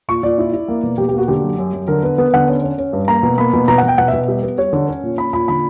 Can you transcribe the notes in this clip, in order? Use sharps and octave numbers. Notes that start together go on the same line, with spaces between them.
A#2 C#6
A#2 D5
E4
E4
A#3
B2
B2 G4
G4
A#3 F#4
D3 G4
F#2
F#2
F#2
D3 A#4
B3 B4
B3
D3 F#5
C#4
C#4
C#4
G2
A#3 A#5
B2
A#3 B5
B2
B2 A#5
F#5
B2
G5
B2 F#5
E5
B2
G3
B3
G3 C#5
D3
C#4
A#2
C#4 B5
A#2 B5
D3 B5